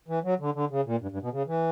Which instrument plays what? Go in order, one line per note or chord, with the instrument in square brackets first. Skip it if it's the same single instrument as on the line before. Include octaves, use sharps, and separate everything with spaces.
[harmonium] E3
F#3
D3
D3
C#3
A#2
G2
G2
B2
C#3
E3